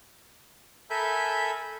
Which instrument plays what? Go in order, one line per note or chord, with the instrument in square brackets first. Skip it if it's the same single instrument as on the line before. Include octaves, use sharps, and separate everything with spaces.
[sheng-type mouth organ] A4 A#4 E5 G#5 B5 G6